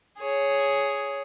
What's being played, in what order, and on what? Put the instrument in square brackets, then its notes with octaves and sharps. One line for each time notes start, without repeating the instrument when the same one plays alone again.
[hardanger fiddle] G#4 C#5